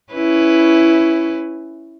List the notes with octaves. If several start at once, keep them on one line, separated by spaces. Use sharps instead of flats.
C#4 E4 B4